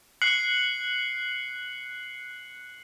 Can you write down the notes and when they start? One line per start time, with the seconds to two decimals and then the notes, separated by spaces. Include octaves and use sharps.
0.22 F#6 C7 C#7 F#7